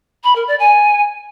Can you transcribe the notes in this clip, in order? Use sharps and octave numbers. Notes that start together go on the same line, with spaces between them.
B5
A#4
D5
G#5